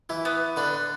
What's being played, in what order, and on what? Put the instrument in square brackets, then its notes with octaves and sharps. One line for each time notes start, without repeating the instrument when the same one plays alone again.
[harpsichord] E3 E4
[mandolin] B3
[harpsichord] D3 D4 [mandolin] B4